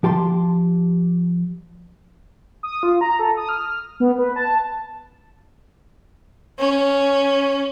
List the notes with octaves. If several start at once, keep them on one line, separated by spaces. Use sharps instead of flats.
F3 G4 A5 C6
D#6
F4
A#5
A4
D#6
F6
B3
B4
A5
C#4